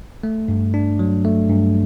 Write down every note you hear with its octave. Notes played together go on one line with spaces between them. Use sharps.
A3
G2
D4
F#3
A3
G2